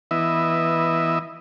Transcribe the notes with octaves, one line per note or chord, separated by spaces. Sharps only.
E3 B3 E4 D#5 E5